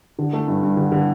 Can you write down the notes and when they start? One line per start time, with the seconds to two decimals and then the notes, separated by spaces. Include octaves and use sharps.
0.19 D3
0.33 A3
0.48 G2
0.63 G2
0.77 D3
0.92 D3